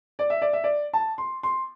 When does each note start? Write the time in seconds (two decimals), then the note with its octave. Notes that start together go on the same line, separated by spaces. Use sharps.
0.19 D5
0.30 E5
0.42 D5
0.53 E5
0.64 D5
0.93 A5
1.18 C6
1.43 C6